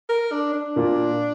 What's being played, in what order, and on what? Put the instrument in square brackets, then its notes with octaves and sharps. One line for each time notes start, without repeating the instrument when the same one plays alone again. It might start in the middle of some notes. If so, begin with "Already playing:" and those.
[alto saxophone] A#4
D4
D4
[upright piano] A#2 A#3 F4